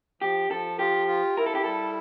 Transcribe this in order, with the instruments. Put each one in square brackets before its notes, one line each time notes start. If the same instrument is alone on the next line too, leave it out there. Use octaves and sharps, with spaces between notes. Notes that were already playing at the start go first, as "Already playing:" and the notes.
[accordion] F3 [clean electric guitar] G4
[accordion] F3 [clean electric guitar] A4
[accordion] F4 [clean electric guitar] G4
[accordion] F4
[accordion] E4 [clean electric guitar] A#4
[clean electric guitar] A4
G4
[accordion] G3 [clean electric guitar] A4